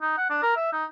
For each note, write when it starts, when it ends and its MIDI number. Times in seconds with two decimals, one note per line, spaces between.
0.02 0.15 63
0.18 0.26 78
0.30 0.42 62
0.43 0.54 70
0.56 0.71 76
0.73 0.85 63